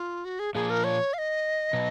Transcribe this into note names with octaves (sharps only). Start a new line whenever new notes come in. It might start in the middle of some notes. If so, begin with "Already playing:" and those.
Already playing: F4
F#4
G#4
A#2 F3 A#3 G#4
A#4
C#5
F5
D#5
B2 F#3